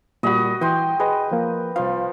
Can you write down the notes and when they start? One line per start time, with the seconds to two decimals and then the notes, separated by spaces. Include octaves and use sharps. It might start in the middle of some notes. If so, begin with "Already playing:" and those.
0.23 A#2 G3 F#4 D#5 B5
0.61 E3 G5 C6
1.00 G#4 B4 D#5
1.31 F3 A#3
1.76 C2 F3 F5